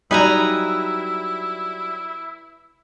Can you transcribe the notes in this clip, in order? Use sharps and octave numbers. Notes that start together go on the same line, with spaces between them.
F#3 G3 D#4 E4 B4 G#5 A#5